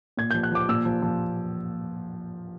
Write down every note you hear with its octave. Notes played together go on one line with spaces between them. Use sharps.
A#2 G#6
F3 G6
F#6
F3 D6
A#2 E6
F3
F3